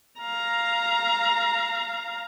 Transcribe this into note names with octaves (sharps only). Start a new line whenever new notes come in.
F5 A#5